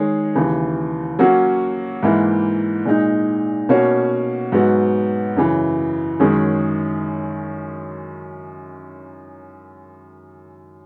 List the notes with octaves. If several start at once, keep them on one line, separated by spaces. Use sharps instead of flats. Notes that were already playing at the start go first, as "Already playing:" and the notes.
Already playing: D#3 G#3 D#4 G#4 C#5
D#2 C#3 E3
F#3 A#3 C#4 F#4
G#2 E3 A#3 E4
A#2 G#3 D#4
B2 A#3 C#4 F#4 C#5
G#2 F#3 B3 F#4
F#2 C#3 E3
F#2 D#3 G#3 C#4 G#4